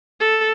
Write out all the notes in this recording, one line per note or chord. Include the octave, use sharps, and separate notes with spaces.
A4